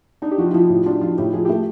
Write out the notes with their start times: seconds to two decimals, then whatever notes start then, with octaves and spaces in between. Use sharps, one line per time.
0.22 D4 D#4
0.31 G4
0.38 F3 F#4
0.46 F4
0.54 F3 E4
0.69 A2
0.86 D4 F4
1.01 F3 F4
1.18 A2 G4
1.33 F3 G#4
1.45 A3 G4